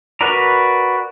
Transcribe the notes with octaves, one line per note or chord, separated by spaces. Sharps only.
F#4 A#4 B4 D5 A#5